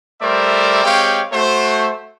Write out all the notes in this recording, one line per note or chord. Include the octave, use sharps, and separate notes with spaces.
G3 A3 A#4 C5 D5 E5
G#3 C4 G4 C#5 F5 G5
A3 F#4 C5